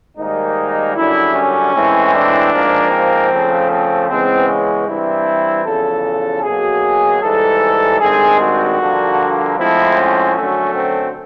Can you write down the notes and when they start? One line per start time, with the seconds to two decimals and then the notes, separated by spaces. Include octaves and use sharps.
0.17 G#2 D#3 G3 A#3 D#4
0.96 F#2 D3 G3 E4
1.35 C#4
1.74 A2 E3 G#3 C4
2.14 D4
2.52 G#2 F3 A#3
2.91 C4
3.31 C#3 F3 A3
3.70 C4
4.09 C#3 E3 G#3 B3 C4
4.48 C#4
4.87 G2 E3 G3 C4 E4
5.65 E2 C#3 F3 A4
6.43 B2 F#3 A#3 G#4
7.22 G#2 E3 G3 A4
8.00 G2 D#3 G#3 C4 G#4
8.39 F#4
8.79 G2 D3 F3 A#3
9.57 A2 F3 G#3 C4 E4
9.96 C#4
10.35 F#2 D3 F#3 A3
10.74 C4